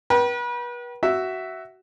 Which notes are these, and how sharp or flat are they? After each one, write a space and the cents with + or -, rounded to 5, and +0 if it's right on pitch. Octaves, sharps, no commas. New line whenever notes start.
B4 -35 G5 -35
F#4 +15 E5 +0